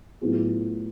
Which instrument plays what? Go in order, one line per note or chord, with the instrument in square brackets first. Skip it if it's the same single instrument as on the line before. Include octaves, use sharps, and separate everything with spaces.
[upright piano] A2 F#3 B3 F4 G#4